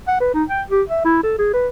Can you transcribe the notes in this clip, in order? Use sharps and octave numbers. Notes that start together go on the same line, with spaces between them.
F#5
B4
D#4
G5
G4
E5
E4
A4
G#4
B4